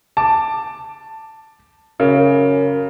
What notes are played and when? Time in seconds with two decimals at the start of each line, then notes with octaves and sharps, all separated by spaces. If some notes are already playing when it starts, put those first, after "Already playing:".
0.17 A5 D6
2.00 F#2 C#3